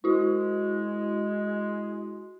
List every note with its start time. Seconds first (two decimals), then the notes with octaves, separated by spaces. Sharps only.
0.04 G#3 E4 F#4